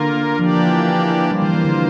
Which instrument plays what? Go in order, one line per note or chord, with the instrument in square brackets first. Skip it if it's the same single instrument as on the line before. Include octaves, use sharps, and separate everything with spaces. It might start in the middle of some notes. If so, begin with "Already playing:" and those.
Already playing: [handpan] D3 [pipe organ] A#3 F4 A#4
[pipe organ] E3 A#3 D4 G4 D5 [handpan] F3
[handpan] G3 [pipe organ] A#3 F4 C5
[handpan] E3
E3
D3